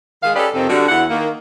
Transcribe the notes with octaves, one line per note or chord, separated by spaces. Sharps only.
D#3 G#3 F5
C#4 G4 A4 B4 D5 D#5
F2 C3 D#3 C4 D#4 A4
D3 G3 F#4
E2 E3 E4 F#5
D#3 A#3